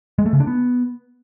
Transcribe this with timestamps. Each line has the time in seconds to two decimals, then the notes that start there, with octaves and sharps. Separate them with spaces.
0.19 G#3
0.26 A3
0.33 C#3
0.40 D4
0.47 B3